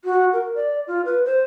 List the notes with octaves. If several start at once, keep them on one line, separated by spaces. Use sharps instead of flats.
F#4
A#4
D5
F4
B4
C5